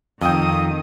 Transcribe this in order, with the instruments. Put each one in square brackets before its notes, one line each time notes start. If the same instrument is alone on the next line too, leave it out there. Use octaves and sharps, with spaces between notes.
[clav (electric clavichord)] F2 G5 [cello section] D#3 [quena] D#6